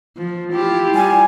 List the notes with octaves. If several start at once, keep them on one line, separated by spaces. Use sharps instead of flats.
F3
E4 F4 G4
G3 G#5